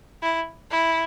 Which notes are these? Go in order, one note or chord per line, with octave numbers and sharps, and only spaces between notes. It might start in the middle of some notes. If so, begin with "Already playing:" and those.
E4
E4